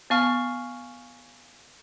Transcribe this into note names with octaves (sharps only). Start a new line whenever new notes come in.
B3 F5 G#5 C#6 F6